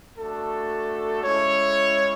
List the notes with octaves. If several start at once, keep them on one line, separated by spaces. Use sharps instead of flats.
A3 D4 F#4 A4
G#3 C#4 E4 C#5